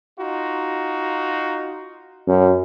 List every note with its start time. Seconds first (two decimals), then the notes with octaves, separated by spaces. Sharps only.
0.19 D#4 F4 F#4
2.27 F#2